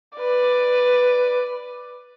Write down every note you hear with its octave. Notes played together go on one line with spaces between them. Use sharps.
B4 D5